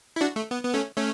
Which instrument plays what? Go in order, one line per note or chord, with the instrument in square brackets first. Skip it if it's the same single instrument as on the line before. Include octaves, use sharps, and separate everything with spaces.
[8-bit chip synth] E4
D4 F#4
A3
B3
B3
A3 C#4
A3 C#4